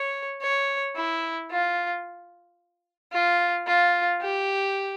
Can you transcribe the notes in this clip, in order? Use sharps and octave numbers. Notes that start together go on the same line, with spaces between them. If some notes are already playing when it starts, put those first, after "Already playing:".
Already playing: C#5
C#5
E4
F4
F4
F4
G4